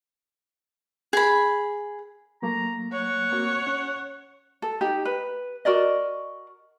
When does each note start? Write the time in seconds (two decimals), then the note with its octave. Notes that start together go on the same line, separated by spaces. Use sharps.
1.13 G#4 B5
2.42 F#3 A3 A#3 A#5
2.93 C#5 F#5
3.32 A#3 C4 F#4
3.67 C#4
4.62 A4
4.81 D#4 G4
5.05 B4
5.65 F#4 A#4 D5 D#5